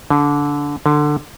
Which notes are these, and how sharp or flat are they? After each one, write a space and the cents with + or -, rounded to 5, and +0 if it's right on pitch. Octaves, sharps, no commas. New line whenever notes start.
D3 -20
D3 +15